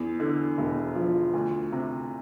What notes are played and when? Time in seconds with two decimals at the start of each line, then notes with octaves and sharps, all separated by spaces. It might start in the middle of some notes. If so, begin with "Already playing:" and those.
Already playing: E2
0.20 D3
0.58 E1
0.95 F3
1.33 D2
1.72 C3